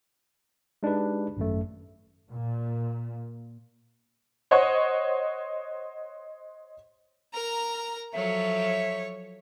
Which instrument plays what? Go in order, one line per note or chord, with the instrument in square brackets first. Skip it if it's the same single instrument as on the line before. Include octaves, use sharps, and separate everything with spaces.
[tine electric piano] G#3 D4 D#4 G4 B4
G#1 F#2 A3
[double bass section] A#2
[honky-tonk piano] C5 C#5 D#5 F#5
[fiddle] A#4 A#5
[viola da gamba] F3 F#3 A4 [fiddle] C#5 [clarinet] E5